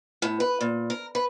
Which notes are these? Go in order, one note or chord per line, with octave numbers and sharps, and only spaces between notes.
A2
B4
A#2
A#4
B4